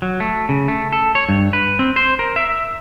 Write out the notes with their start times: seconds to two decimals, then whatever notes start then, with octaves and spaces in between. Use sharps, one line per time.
0.02 F#3
0.20 A3
0.49 C#3
0.68 A3
0.93 A4
1.15 C#5
1.29 G2
1.53 B4
1.79 C4
1.96 C5
2.19 A#4
2.36 E5